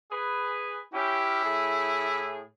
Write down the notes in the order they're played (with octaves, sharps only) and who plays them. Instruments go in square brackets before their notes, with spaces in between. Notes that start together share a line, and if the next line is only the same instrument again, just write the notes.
[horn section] G#4 B4
[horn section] C#4 G4 [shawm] E4
[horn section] A2 G#4